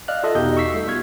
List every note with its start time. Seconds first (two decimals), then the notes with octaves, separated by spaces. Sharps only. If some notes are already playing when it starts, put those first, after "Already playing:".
0.08 D5 D#5 F5 F6 F#6
0.23 F4 A4 D#5 E5
0.35 E2 B2 D#4 G4 D#5 G6
0.57 C#6 E6 B6 C7
0.74 G3 A3
0.87 B3 F4 C#6 F6 G#6